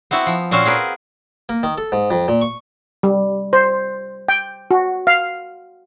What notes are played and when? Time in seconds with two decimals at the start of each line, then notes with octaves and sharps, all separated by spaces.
0.11 B3 C4 E4 F#4
0.27 F3
0.51 A#2 C4 C#4 F#4 C5 F5
0.65 C4 G#4 A#4 B4
1.49 A#3
1.63 D#3
1.78 A4
1.92 G#2
2.11 F2
2.28 A#2
2.41 C#6
3.03 G3
3.53 C5
4.29 G5
4.71 F#4
5.07 F5